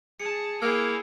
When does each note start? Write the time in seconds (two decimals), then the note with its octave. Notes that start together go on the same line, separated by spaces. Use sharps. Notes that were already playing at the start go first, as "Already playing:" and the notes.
0.20 G#4 A5 C#7
0.62 A#3 E4 G#4 C#5 F5 G5 E6 G#6